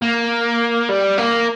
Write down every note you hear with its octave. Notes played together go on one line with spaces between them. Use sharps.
A#3
G3
A#3